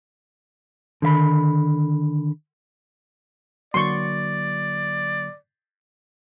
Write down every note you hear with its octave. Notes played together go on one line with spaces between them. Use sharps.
D3 D#3 E5 B5
D3 F#3 A#3 D5 C6 C#6